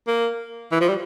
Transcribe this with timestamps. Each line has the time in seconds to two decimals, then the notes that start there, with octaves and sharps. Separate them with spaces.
0.07 A#3
0.72 E3
0.81 F3
0.89 G3